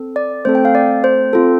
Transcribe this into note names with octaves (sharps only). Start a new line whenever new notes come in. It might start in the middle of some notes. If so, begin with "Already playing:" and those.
Already playing: C4 A4
D5
A3 C4 A4 C5
G5
F5
D5
C5
C4 F4 A4